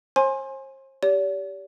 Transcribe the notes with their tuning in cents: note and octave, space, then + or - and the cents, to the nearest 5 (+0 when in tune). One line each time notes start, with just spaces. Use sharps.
C5 +40 G#5 +0 C6 +25
G4 +0 D5 -45